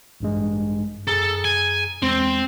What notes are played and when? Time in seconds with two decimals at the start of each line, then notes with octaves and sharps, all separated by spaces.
0.20 A1 G2 G#3
1.08 F#2 G#4 A4 A#5
1.45 G#5
2.03 E2 G#3 C4